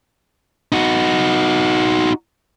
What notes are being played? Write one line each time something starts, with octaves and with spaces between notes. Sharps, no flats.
D#4 F#4